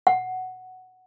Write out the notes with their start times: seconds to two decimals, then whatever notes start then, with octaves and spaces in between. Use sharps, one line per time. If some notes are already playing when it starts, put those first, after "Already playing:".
0.07 F#5